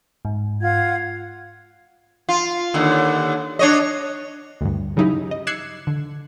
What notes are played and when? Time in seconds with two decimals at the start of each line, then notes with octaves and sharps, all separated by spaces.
0.25 G#2
0.62 F4 F#5 G#6
2.29 F4
2.74 D#2 D3
3.59 D4 C#5 D#5
4.61 D2 G2
4.97 C#3 F#3 D#4 E4 G4
5.31 D#5
5.47 D6 E6 F#6 G#6 C7 C#7
5.87 D3